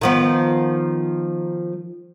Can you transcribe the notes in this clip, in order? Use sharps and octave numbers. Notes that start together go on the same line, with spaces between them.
D#3 F3 B3